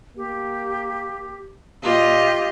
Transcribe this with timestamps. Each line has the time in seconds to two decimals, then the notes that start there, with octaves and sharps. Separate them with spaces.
0.17 A#3 G4
1.83 A#2 F4 G4 D#5